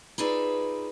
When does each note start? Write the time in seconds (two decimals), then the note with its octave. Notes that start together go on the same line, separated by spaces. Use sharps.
0.18 D#4 F4 G#4 B4 D5 E5